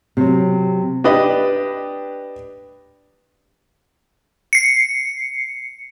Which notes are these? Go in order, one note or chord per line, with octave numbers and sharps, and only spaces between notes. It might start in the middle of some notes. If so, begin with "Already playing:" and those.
C3 F#3
D4 G4 B4 D#5 B5
C7 C#7